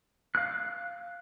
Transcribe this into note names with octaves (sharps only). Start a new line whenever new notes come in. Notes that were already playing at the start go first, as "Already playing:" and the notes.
F5 F#6